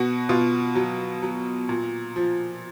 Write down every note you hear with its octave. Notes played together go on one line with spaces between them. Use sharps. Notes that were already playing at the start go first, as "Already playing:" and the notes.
Already playing: B2 F#4
B2 F4
F#3
F#3
A#2
F3